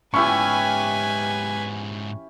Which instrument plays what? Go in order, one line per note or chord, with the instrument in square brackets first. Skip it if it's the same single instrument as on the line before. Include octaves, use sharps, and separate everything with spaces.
[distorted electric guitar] G#2 B3 [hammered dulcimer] C#4 E4 G4 [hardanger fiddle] B4 G#5 [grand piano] C#6